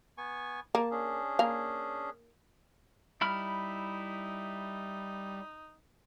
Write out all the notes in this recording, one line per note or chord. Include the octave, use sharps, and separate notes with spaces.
B3 G#5 C#6
A#3 A5
C#4 D4 G#4
A#3 F5
G3 D#4 E4 B5 F6